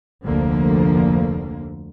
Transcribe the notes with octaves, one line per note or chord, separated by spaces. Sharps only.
F1 D2 D3 F3 A#3